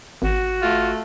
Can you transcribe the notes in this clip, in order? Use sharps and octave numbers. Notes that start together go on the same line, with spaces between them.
G#1 F#4
A3 F4